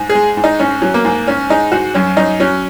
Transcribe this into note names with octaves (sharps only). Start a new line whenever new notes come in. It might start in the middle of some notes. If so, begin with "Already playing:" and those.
Already playing: G#2
G#4
G#3
G#2
D#4
G#2 C#4
F#3
A#3
G#2
G#2 C#4
G#3 D#4
G#2 F#4
F#2 C#4
F#2 D#4
F#3 C#4